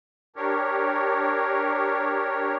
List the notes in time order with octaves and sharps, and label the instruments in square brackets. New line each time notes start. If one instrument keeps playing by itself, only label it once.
[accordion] D4 G4 A#4 C#5